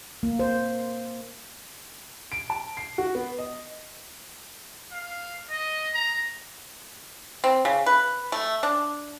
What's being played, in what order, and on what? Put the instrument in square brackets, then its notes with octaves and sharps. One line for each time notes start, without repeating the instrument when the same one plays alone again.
[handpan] A#3
C5
[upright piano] D7
A5
C7
F#4
B3
D#5
[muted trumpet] F5
D#5
A#5
[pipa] C4
C#3
B4
A3
D4